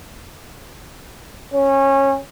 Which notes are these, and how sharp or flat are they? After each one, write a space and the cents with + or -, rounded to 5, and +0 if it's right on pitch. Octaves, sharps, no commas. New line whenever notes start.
C#4 -20